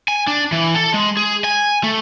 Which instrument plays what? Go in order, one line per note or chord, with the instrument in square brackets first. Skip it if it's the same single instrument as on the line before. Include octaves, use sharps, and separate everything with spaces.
[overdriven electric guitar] G#5
D4
E3
A4
G#3
G#4
G#5
A3